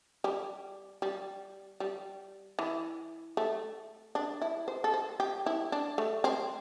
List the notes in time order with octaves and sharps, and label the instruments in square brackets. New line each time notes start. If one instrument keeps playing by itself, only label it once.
[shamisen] G3
G3
G3
E3
A3
D4
E4
C5
A4
C5
G4
E4
D4
A3
C4